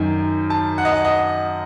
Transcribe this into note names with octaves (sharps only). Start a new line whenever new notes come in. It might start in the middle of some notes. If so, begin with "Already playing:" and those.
Already playing: F#2 D#3
A5
F#5
D#5
F#5
D#5